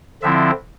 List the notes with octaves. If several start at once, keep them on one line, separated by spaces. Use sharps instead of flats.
D3 F3 C4 E4 E5